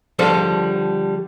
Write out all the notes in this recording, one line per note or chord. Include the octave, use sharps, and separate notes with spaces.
D3 F3 G3 A4 C5 A5